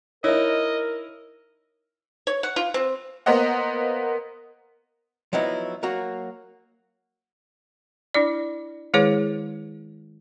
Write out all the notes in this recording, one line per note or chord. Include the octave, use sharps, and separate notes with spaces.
D#4 E4 A#4 C#5 D#5
C#5
F#5
F4
C4
A#3 B3 A#4 C5 D#5 F#5
F3 F#3 B3 D#4 E4
F#3 A#3 F#4
D4 E4 D5
D#3 G#3 E4 G#4 B4 C#5